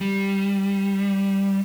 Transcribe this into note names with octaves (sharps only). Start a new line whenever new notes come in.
G3